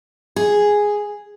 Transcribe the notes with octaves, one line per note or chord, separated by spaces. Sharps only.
G#4